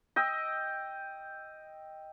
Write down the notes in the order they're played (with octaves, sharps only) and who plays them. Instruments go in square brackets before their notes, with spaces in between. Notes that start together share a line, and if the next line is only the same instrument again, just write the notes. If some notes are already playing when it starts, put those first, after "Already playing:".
[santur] D#5 G5 E6